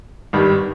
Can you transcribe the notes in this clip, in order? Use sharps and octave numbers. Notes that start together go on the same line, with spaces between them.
G#1 G2 D#3 G3